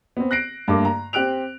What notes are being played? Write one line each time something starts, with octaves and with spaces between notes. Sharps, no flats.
B3 C4
F#6 A#6 C7 D7
G2 A3 A#3 D6
A#5
C4 G4 F#6 D7 F7